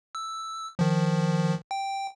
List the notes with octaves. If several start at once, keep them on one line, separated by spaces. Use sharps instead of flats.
E6
D#3 F3
G5